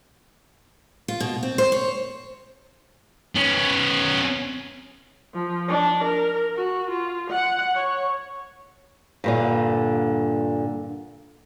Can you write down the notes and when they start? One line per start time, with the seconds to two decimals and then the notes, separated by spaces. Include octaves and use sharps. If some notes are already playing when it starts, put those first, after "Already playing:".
1.08 F4
1.20 B2
1.43 C4
1.58 C5
1.72 C#5
3.35 B3 C#4
5.34 F3
5.68 D4
6.04 A#4
6.56 F#4
6.90 F4
7.31 F#5
7.75 C#5
9.24 G2 A#2 D3